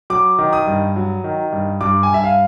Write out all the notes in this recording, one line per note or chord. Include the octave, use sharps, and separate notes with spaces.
F#3 D6
D#3
D#6
G2
F#3
D#3
G2
G2 D6
G#5
G2 E5
F5